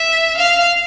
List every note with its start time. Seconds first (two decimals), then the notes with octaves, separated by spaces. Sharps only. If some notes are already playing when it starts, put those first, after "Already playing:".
Already playing: E5
0.37 F5